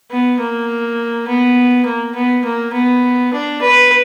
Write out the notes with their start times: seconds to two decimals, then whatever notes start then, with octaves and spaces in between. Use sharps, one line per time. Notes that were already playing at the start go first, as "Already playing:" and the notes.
0.11 B3
0.40 A#3
1.27 B3
1.85 A#3
2.15 B3
2.44 A#3
2.73 B3
3.33 D4
3.62 B4